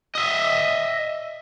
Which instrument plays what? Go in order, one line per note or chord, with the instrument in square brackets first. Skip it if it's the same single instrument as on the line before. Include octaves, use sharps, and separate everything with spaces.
[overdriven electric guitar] D#5 E5